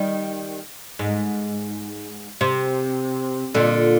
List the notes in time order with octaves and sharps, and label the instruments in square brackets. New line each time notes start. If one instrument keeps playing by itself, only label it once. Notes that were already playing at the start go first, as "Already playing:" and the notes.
Already playing: [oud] D#3 G3
G#2
C3
A#2 D3